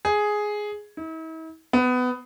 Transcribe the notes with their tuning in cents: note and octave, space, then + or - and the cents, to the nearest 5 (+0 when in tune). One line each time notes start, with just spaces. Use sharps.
G#4 +5
E4 -45
B3 +20